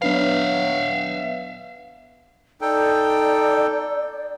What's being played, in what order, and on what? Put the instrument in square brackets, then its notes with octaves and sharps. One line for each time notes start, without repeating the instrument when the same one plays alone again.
[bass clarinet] F#3 [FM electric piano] B3 D4 B4 [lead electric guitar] E5 F5
[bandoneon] D#4 A4 G5 [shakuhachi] D5